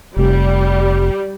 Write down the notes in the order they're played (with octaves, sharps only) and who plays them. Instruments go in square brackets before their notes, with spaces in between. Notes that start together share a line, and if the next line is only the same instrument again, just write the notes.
[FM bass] F1 [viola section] G3